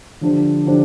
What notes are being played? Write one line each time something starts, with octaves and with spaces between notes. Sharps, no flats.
D3 F3 D4 G4 C5
D3 F3 D4 G4 C5